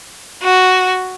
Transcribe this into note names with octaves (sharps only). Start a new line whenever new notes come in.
F#4